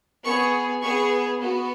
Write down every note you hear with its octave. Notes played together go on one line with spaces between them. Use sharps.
B3 G#4 C#6
B3 G#4 C#6
B3 F#4